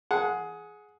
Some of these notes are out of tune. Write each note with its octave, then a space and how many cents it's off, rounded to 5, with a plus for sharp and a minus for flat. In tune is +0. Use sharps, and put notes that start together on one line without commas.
G#4 +15 F#5 -15